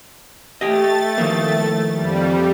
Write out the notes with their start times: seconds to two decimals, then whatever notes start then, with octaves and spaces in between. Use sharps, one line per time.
0.61 A3 G4 D#5 A6
1.18 D#3 F3 A#3
1.93 F2 G3